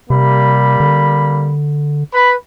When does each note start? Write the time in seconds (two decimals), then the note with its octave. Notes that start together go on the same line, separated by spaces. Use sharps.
0.10 C3 G3 A#3 B5
0.80 D3
2.14 B4 B5